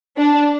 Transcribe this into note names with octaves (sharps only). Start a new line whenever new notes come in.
D4